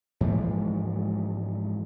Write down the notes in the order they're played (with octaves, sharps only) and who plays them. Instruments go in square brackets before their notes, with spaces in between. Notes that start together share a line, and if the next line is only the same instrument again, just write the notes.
[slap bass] G#2 E3 F3 G#3